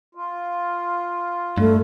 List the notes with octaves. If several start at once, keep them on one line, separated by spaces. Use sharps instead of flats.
F4
G2 A3